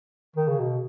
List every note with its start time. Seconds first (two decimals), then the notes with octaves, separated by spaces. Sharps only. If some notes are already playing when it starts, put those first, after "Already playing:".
0.36 D#3
0.48 C#3
0.59 B2